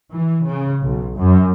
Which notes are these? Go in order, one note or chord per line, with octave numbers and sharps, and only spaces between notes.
E3
C#3
B1
F#2